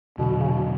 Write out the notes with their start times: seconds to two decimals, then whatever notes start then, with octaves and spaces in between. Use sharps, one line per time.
0.18 E2 B2 D3 F#3
0.40 C#3
0.49 B2